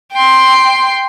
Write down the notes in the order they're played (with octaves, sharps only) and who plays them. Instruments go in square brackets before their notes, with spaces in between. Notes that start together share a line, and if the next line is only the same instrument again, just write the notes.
[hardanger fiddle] G5 C6